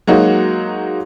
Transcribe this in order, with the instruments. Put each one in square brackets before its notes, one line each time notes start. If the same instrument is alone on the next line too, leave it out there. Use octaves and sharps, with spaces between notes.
[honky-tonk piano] F#3 G#3 A#3 D#4 F#4